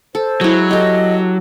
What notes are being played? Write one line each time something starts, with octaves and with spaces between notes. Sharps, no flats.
A4 C5
F#3 G#3 E4
G4 A4 D#5